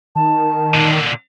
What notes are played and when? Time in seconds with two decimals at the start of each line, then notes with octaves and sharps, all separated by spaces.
0.15 D#3 A5
0.74 A#2 D3